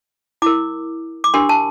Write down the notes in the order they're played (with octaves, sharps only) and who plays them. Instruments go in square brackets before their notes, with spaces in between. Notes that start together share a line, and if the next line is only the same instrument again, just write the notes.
[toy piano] E4 A#4 D6
D6
D4 G4 A#4 C6
A5